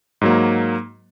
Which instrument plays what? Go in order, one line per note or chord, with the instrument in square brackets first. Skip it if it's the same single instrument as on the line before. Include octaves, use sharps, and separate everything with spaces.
[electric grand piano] G#2 F#3 A#3